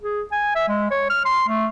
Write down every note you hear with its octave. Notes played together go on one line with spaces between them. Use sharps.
G#4
G#5
E5
G#3
C#5
F6
C6
A3